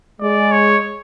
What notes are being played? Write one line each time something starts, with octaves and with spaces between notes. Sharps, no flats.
G#3 D5
C#5